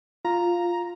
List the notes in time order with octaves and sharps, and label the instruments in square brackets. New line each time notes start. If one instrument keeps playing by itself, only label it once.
[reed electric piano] F4 [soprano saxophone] A#5